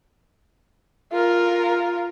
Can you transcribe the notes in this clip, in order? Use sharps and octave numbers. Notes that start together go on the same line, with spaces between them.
F4 A#4